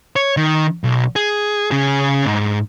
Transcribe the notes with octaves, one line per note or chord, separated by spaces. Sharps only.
C#5
D#3
B1
G#4
C#3 G#4
G#2